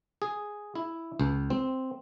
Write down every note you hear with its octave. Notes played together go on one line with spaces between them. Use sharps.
G#4
E4
C#2
C4